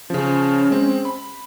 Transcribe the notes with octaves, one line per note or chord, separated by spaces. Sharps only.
C#3 F3 C#4
G#3 C4
B5